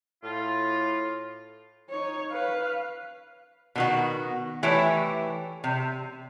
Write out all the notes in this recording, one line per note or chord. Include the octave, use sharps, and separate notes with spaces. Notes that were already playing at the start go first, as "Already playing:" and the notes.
A2 F4
D#4 C#5
B4 F5
B2 D#3 F#4
E3 A3 E4 G4 C#5
C3